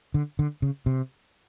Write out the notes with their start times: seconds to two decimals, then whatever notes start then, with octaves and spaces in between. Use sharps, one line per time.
0.14 D3
0.39 D3
0.62 C#3
0.86 C3